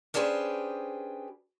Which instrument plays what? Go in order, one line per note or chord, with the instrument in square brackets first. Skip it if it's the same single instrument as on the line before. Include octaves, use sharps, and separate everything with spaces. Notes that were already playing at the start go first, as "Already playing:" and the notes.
[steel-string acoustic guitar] C#4 D4 G4 G#4 B4 C5